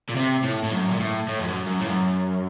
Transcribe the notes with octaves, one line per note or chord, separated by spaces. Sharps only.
A#2
C3
A2
A2
F#2
A#2
A2
A2
F2
F#2
F#2
A2
F#2